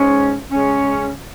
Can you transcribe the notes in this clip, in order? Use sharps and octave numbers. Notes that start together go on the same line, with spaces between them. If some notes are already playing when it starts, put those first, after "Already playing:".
Already playing: G#2 G#3 C#4
C#3 G#3 C#4